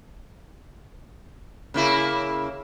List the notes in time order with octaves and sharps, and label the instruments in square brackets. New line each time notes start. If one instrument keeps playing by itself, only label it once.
[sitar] C#3 A#3 E4